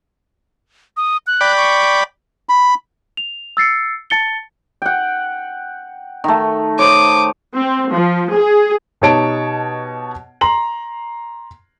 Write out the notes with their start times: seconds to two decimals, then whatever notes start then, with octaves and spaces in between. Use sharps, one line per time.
0.97 D#6
1.27 F#6
1.41 D5 G5 B5
1.57 C#6
2.49 B5
3.17 F7
3.57 E6 A6 C7 C#7
4.10 A5 A6 C#7 G7
4.82 F#5 G5
6.24 D#3 A3
6.79 C5 C#5 D6 D#6
7.56 C4
7.92 F3
8.35 G#4
9.02 B2 D#4 G4 C#5 A5 D7
10.41 A#5 C6 F#7